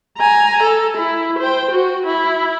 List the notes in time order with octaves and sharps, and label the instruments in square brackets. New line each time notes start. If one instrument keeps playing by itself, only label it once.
[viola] G#5 A#5
A4
E4
C5 G5
F#4
E4